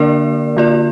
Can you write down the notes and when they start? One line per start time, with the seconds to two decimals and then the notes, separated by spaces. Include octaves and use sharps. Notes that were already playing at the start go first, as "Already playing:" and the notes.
Already playing: D3 A#3 D4 A#4 D5
0.57 D3 A#3 F4 D5